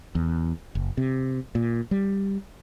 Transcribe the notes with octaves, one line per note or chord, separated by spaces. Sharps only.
E2
F#1
C3
A#2
G3